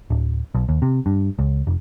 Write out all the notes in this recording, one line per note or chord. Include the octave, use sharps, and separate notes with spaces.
D1
B1
D#2
C3
G2
C#2
F1